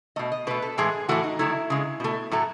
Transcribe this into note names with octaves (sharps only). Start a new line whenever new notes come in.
B2 A3 D#5
D#5
B2 A3 B4
A4
A2 E3 G#3 G#4
A2 E3 A3 F#4
D#4
D#3 F#3 A3 E4
C#3 G#3
B2 A3
A2 F#3 A3